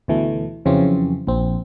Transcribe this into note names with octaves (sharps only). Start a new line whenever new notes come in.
D2 B2 E3 A3
F2 C#3 E3 F#3 C4 C#4
A#1 C4